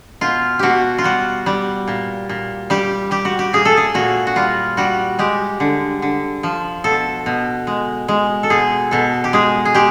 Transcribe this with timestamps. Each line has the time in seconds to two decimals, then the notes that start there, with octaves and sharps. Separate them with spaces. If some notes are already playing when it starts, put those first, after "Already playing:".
0.21 B2 F4
0.59 B2 F#4 G4
0.98 F4
1.04 G3 F#4
1.46 G3
1.88 A#2
2.29 A#2
2.70 G3 G4
3.11 G3 G4
3.25 F#4
3.39 G4
3.53 A#2 G#4
3.65 A4
3.77 G#4
3.94 A#2 F#4
4.27 F#4
4.36 G3 F4
4.77 G3 F#4
5.19 G#3 G4
5.60 D3
6.02 D3
6.43 F3
6.84 B2 A4
7.26 B2
7.67 G#3
8.08 G#3
8.43 A4
8.50 B2 G#4
8.91 B2 A4
9.24 G4
9.33 G#3 G#4
9.65 G#4
9.75 G#3 G4